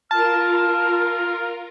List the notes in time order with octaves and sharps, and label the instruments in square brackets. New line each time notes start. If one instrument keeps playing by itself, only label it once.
[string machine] F4 A#4 [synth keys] A5 [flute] F6